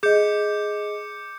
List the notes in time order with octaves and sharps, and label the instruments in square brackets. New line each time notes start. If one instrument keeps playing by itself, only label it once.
[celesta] G#4 D#5 [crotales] D6 G6 C#7